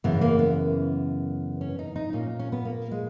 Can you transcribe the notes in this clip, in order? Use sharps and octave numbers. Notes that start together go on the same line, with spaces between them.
F#2 C#3 E3 B3
A#3
B3
C#4
D#4
D#4
A#2 C#4
C#4
B3
A#3
G#3